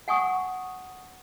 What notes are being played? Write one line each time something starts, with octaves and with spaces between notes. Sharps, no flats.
F#5 G#5 C#6 D#6